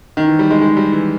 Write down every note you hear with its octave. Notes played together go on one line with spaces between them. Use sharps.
D#3
E3
G3
G#3
G#3
G3
E3